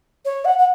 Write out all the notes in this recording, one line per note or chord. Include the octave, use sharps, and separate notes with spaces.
C#5
F#5
F#5